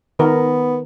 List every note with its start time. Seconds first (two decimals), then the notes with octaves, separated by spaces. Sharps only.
0.19 D#3 B3 A#4